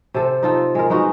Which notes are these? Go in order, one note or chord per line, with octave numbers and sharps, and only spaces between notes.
C3 A4 C5
D#4 F4 A4
G#3 A#4
G#3 B3 D#4 F#4